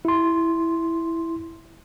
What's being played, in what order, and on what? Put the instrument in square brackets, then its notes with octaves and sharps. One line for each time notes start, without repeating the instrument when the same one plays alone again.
[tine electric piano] E4 C6